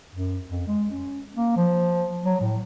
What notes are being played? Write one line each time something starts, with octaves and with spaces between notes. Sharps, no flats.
F#2
F2
G#3
C#4
A#3
F3
F#3
A2